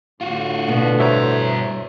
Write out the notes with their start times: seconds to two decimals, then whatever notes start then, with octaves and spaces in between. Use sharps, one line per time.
0.21 A2 D3 F4 F#4
0.68 B2
1.00 G2 C5 C#5 E5 A#5